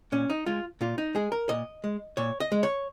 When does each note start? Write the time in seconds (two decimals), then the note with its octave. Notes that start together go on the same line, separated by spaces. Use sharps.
0.12 A#2 C#4
0.30 D#4
0.46 G#3 F4
0.81 A#2 F4
0.98 D#4
1.15 G#3 G#4
1.32 A#4
1.49 A#2 D#5
1.84 G#3
2.17 A#2 C#5
2.40 D#5
2.52 G#3
2.63 C#5